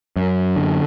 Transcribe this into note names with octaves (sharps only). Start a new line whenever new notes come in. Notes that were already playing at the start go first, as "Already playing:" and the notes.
F#2
D3